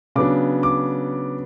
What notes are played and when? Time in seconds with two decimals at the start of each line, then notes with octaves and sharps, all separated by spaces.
0.16 C#3 F#3 B3 D4 D6
0.63 D6